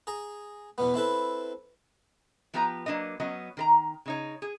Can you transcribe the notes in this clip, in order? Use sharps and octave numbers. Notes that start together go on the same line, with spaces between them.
G#4 A#5
E2 B2 B3
C4 E4 A4 B4
F3 B3 G4 B4 D5 A#5
F#3 A#3 D4 B4 D#5
F#3 B3 C#4 D#5
D#3 A#4 A#5
C#3 D#4 C#5
G#4